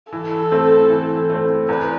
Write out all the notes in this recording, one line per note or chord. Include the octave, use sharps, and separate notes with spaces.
E3 A4
A3 C4
E3
A3 C4
E2 B4